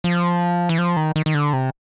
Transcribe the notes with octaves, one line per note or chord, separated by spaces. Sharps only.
F3
E3
F3
D#3
D#3
D#3
D3
C3